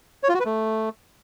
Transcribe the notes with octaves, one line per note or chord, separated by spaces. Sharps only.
C#5
F4
F#4
B4
A3